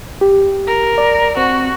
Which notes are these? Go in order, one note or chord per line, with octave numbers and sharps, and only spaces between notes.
G4
A#4
D5
C4 F#4